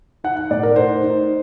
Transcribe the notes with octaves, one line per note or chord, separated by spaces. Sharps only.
D#4 F#5
F#5
A2 D5
A#4
D#4 C5
D#4